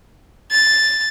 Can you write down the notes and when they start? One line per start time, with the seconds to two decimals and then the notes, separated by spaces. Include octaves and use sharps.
0.51 A6